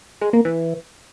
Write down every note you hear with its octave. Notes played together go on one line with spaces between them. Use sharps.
G#3
A#3
E3